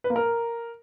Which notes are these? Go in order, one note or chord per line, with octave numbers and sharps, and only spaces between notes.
B4
A#3
A#4